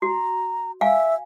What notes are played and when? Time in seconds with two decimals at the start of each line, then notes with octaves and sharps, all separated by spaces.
0.02 F#4 A#5
0.81 E5 F5 G#5